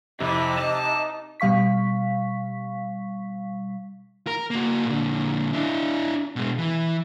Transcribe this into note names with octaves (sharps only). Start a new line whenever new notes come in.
F2 C3 E4 D#5 D6
D#4 A5
B2 G3 F5 C#6 B6
A#4
A#3 F#4
A#2 D3
D4 E4
B2 G#3
E3